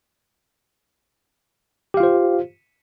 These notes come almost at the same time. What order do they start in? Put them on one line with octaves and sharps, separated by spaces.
G4 F5 F4 C5